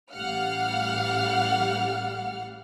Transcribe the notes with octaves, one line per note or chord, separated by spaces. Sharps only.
A1 G3 F5 F#5 F6